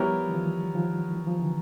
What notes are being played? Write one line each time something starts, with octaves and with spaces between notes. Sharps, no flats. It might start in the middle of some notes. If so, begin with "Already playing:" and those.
Already playing: F3 G3 B3 E4 G4 A#4 C#5
E3
D#3 F3
D#3 F3
E3
F3
D3 E3